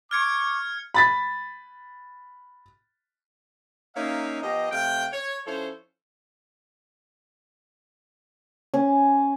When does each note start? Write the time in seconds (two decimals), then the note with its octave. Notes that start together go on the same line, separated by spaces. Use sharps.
0.11 C#6 D6 F6 G#6 C#7
0.94 B5 A6 B6
3.96 A#3 C#4 D#4 C#5 E5 F5
4.42 F3 B3 G4 D#5
4.72 C3 A3 F5 G5
5.13 C#5
5.46 F3 C#4 E4 A4 C5 C#5
8.74 C#4